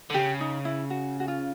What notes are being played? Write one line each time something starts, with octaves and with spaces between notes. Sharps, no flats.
D3
C#3 G4
D#4
E4
F#4
F#4
F4